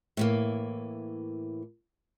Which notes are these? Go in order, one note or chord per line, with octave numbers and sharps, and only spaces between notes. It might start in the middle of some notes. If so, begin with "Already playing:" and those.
A2 E3 A#3